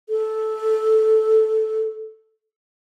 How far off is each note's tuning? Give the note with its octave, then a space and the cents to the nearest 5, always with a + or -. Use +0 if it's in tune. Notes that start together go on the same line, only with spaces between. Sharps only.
A4 -10